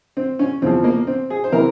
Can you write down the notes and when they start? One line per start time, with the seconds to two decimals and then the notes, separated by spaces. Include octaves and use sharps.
0.17 C4
0.39 C#4
0.61 E2 C#3 F3 C4
0.84 A#3
1.07 C4
1.30 G#4
1.44 C5
1.52 C3 E3 A#4